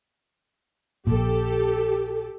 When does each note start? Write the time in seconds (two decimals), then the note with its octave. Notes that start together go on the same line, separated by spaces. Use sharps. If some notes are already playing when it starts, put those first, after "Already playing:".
1.07 A#1 A#2 G4 A4